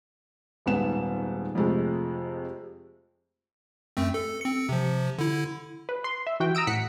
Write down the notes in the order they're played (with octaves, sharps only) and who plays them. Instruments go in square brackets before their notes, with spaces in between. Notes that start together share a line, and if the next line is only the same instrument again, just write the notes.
[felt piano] D#1 G#2 B3 E7
F2 C3 G#3 A3
[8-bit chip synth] F#2 A3 C4
A4
C4 C#7
C3 F3
D3 E4
[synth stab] B4
C6
E5
E3 F#4 G5
A#5 D#6 E6 D7
A2 F#5 B6 C#7